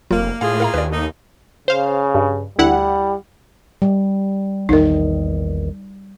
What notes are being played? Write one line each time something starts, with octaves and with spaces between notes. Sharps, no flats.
F1 F#3 A#3 F4
A2 A#3 F4 G#4 F5
A#4 F5 A#5
D#2 B4 D5
A3 A#3 D#4
C#3 C5 F5
G2
D2 G3 E4 F#5
G3
A#1 E2 D#3 D#4 A#4